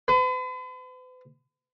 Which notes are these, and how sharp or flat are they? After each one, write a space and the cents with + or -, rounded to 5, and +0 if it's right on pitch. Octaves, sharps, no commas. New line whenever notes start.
B4 +45